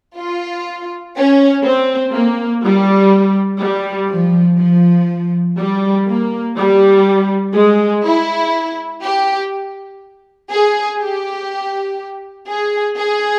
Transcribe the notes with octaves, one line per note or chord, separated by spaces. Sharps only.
F4
C#4
C4
A#3
G3
G3
F3
F3
G3
A#3
G3
G#3
E4
G4
G#4
G4
G#4
G#4